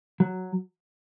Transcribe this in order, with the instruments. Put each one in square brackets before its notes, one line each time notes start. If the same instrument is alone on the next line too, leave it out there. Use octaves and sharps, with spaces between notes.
[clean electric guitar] F#3